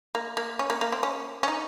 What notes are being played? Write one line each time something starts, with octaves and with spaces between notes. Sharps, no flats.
A#3
A#3
C#4
A#3
A#3
C4
C#4
C#4
D#4